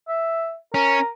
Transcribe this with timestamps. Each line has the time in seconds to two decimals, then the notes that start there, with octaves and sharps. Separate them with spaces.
0.08 E5
0.74 C#4 A#4